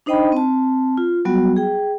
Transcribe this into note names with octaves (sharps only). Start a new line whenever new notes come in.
D4 D#4 C5 D#5 G5 B5
C4 A5
F4
F#3 G3 B3 F#4
G#4 G5